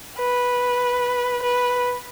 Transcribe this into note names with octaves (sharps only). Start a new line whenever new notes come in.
B4
B4